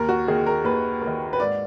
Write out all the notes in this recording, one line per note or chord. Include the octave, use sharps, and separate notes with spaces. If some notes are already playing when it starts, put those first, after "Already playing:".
Already playing: D#2 A#4
F#4
D#3 A#3 G#4
A#4
D#2 B4
A#3
D#3
B4
G#2 D5